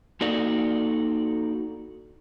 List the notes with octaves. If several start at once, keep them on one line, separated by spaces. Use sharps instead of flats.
A#3 D#4 F#4 A4 D5